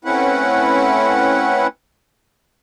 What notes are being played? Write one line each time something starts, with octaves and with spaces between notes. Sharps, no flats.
A3 C4 C#4 E4 B4 F#5